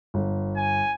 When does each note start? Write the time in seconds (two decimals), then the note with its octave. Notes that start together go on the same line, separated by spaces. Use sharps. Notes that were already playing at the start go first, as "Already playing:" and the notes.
0.14 G1
0.57 G#5